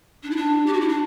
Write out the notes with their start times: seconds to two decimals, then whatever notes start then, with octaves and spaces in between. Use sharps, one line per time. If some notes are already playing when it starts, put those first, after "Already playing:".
0.23 D4
0.31 E4
0.37 D4
0.66 G4
0.73 F#4
0.81 E4
0.89 D4